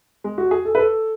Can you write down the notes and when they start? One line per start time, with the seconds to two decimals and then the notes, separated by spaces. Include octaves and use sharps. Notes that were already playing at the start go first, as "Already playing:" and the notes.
0.24 G#3
0.38 F#4
0.51 G#4
0.65 A4
0.75 B4
0.79 A4